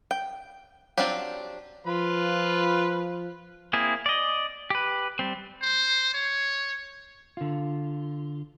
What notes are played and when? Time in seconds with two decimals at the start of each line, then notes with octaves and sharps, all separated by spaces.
0.11 G5
0.97 F#3 C4 D4 F4 G4
1.87 F3 F4 B4 B5
3.73 A#3 C4 E4 G#4
4.06 D5 D#5
4.70 G4 B4
5.19 G3 C4
5.62 C5
6.14 C#5
7.37 D3 F4